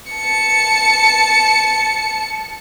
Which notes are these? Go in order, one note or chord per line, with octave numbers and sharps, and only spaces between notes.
A5 C#7